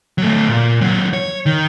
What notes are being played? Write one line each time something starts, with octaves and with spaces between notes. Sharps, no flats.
F#3 A3
A#2
D#2 F#3
C#5
D#3